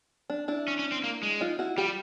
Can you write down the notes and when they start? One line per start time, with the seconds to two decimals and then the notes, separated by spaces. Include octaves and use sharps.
0.30 D4
0.48 D4 E4
0.68 C#4
0.79 C#4
0.92 C4
1.04 A#3
1.23 G#3
1.41 D#4 F4
1.59 E4 F#4
1.78 G3 F4 G4